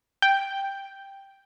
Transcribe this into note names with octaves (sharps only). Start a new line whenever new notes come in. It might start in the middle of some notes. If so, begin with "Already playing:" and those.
G5